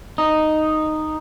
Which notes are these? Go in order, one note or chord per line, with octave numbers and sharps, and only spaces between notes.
D#4